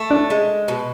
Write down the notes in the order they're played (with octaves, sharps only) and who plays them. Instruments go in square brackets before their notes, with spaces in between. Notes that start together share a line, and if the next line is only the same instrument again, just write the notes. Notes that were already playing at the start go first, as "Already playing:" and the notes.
Already playing: [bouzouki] A3
[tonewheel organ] D4
[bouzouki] G#3
B2